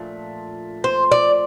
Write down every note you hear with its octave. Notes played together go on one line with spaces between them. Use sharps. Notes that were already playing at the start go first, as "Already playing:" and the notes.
Already playing: A#2 F3 A3 D4
C5
D5